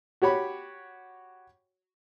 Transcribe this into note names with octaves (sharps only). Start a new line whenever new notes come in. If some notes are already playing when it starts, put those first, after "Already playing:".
F#4 G4 C#5 B5